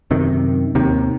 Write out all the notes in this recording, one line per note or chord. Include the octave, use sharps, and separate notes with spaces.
F#2 C3 D#3
D#2 C3 D#3